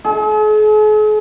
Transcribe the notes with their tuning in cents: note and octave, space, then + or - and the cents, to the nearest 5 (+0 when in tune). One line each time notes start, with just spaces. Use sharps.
G#4 +45